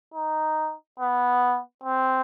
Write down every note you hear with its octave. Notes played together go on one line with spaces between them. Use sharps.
D#4
B3
C4